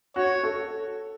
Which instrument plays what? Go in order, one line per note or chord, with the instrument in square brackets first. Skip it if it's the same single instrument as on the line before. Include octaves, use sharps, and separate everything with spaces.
[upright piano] F#4 [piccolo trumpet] C#5
[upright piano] A4